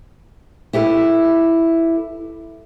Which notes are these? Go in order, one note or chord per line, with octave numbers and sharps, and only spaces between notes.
E4 G4 A4 B4